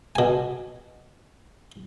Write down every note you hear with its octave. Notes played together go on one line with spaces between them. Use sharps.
B2 G#5